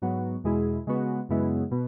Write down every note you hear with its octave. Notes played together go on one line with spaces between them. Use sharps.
G#2 F#3 B3 F#4
E2 B2 G#3 E4 G#4
C#3 G#3 B3 F#4
F#2 C#3 G#3 B3 E4
B2 B3